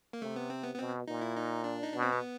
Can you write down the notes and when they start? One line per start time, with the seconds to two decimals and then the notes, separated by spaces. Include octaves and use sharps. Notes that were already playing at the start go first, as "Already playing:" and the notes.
0.13 A#3
0.22 C3 A3
0.36 B3
0.50 C4
0.63 B3
0.74 B3
0.79 B2 C4
1.08 A#2 D#4
1.21 E4
1.36 D#4
1.64 D4
1.84 D#4
1.93 B2 D4
2.02 C4
2.12 B3